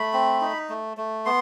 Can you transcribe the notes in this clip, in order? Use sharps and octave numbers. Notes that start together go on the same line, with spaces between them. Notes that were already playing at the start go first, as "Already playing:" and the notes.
Already playing: A3 B5
C4
D#4
A3
A3
B3 C6